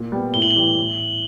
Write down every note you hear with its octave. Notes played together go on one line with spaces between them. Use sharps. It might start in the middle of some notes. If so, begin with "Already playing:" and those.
Already playing: A#2
G3 B3
A2 G7
F#7
G7
E3 G3
A2